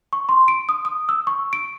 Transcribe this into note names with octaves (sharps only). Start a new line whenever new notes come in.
C#6
C6
D7
D#6
D#6
E6
C#6
D7